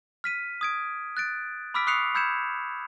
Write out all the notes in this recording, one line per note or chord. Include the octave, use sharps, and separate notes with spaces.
F6 B6 D#7
D#6 G#6 D7
F#6 A6 D7
B5 D6 E6 F6 B6 D7
C#6 D#6 F#6 C7 C#7 F7
B5 E6 G6 G#6 C#7 E7